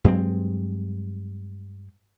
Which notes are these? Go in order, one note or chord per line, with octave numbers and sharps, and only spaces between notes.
G2 F#3 G#3 C4